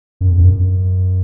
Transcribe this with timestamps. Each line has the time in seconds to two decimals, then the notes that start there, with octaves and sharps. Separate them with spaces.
0.21 F#2
0.31 E2
0.37 G2
0.41 F#2